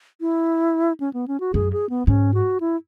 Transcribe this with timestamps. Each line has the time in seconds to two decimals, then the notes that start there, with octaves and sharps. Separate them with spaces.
0.21 E4
1.00 C#4
1.13 B3
1.28 C#4
1.40 F#4
1.54 F#2 G#4
1.72 G#4
1.90 B3
2.07 G#2 C#4
2.34 F#4
2.60 E4